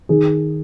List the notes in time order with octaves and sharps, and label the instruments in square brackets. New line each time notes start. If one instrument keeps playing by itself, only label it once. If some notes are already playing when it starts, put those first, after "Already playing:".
[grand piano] D#3 G#4